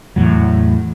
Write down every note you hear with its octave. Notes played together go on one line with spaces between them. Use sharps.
E2 A2 F#3